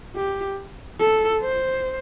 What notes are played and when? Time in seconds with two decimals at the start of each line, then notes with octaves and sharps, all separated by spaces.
0.16 G4
0.99 A4
1.42 C5